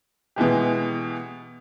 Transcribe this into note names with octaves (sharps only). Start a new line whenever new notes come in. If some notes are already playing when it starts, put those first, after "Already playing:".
B2 E3 G#3 G4